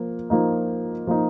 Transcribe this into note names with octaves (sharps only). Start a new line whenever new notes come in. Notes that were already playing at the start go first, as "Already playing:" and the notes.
Already playing: F3 A#3
F3 A#3 D#4
F3 A#3 D#4